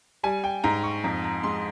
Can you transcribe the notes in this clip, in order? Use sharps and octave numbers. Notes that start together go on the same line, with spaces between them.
G3 G#5
G5
G#2 A#5
C#6
F2 A#5
A#5
G#3 C6